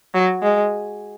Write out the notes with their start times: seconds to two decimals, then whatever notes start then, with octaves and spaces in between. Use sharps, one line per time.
0.14 F#3
0.42 G#3